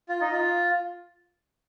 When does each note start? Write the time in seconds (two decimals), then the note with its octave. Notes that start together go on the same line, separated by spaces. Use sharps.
0.09 F4
0.21 D#4
0.32 F4